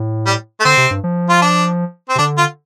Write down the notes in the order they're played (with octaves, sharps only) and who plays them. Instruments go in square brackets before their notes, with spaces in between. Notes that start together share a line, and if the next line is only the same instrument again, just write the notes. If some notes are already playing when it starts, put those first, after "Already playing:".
Already playing: [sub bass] A2
[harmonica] G3
A3
[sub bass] D3 [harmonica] C4
[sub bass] C3
G2
F3
[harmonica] F4
D4
C4
[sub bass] C3
[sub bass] D3 [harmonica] D4
[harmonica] F4